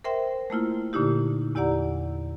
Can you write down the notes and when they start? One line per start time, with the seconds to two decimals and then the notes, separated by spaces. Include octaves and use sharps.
0.04 A#4 C5 E5 G5 C6
0.50 A3 A#3 E4 F4
0.93 A#2 D3 A#3 D#4 E4 G4
1.55 E2 E4 G4 D5 F#5 A#5